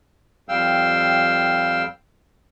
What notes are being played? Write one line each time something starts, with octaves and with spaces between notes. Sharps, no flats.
F2 G3 F5 G5 E6